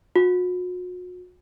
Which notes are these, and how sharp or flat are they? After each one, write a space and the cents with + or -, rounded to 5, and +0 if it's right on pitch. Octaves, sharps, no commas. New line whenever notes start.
F#4 -40